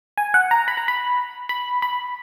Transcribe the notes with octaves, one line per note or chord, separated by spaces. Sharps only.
G#5
F#5
A#5
B5
A#5
B5
B5
B5